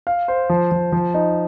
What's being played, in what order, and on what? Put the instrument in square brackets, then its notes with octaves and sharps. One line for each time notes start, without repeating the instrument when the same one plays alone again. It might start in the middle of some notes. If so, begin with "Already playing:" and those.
[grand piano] F5
C5
F3
F3
F3
D#4